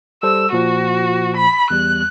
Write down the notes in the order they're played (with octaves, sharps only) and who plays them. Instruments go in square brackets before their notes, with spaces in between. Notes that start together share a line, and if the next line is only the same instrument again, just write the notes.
[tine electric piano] G3 A4 C5 [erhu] E6
[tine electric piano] A#2 F3 [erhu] F#4
[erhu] B5
[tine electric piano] E2 G3 [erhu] F#6